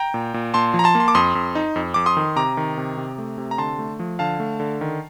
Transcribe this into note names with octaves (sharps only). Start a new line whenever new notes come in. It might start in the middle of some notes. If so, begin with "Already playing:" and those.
Already playing: G5 A#5
A#2
A#2
A#2 A5 C6
F3
A#5
A5 C6
A#3
C6
D6
F2 C6 D#6
F2
D#4
F2
F2 D6
C6 D#6
D#3
C3 A#5 D6
D#3
C3
C3
A3
C3
A#5
D3 A5 C6
A3
F3
D3 F5 A5
A3
D3
D#3